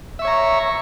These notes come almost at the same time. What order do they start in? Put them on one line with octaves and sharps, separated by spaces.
E5 C#6 C#5 A#5